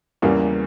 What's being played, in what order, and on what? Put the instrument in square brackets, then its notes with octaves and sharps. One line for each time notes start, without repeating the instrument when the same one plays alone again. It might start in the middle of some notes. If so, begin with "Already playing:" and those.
[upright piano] E2 C#3 E3 G3 A#3